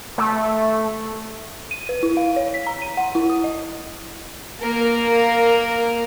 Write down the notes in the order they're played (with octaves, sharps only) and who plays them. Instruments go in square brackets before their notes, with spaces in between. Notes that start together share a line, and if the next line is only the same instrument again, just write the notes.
[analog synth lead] A3
[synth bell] D#7
B4
E4
F5
C#5
B6
A#5
D#7
F#5
E4
D#6
D#5
[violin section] A#3 A#4